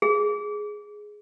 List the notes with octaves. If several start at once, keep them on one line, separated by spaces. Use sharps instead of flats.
G#4